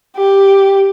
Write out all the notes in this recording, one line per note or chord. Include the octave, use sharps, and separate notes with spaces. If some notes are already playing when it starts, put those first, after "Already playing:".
G4